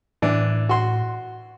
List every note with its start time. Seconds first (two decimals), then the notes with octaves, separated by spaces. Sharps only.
0.22 A2 E3 D4
0.69 F#4 C6